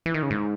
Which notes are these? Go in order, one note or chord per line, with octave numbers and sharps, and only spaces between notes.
E3
D#3
C#3
G#2